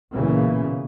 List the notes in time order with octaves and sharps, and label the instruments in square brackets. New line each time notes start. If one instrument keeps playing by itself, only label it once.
[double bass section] B1 A#2 C#3 E3 A#3